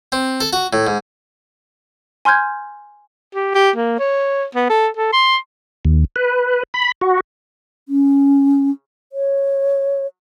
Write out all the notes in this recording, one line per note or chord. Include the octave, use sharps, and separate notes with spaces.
C4
A4
F#4
A2
G#2
G#5 C6 F6 G6 G#6
G4
G4
A#3
C#5
B3
A4
A4
C6
D#2
B4
B5
F#4
C#4
C#5